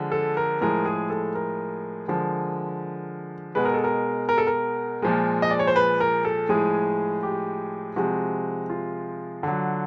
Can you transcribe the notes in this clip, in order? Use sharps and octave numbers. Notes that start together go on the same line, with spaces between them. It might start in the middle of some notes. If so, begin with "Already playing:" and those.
Already playing: D3 F3 G#3
A4
A#4
A2 F3 G#3 A#4
G#4
A4
A#4
D3 F3 G#3
B2 G#3 B4
A#4
A4
A#4
A#4
A4
A#4
A#2 F3 G#3
D#5
D5
C#5
C5
B4
A#4
A4
A2 F3 G#3 G#4
G4
C3 F3 G#3 F#4
F4
D3 F#3